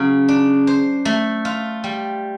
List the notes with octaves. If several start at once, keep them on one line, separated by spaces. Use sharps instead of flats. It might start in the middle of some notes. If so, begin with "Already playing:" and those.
Already playing: C#3 F#3
D4
C5
A3
F4
G3